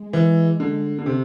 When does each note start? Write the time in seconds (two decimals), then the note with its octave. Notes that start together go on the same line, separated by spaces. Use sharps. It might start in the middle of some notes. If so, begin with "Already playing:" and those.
Already playing: G#3
0.13 E3
0.60 D3
0.99 D3
1.06 C3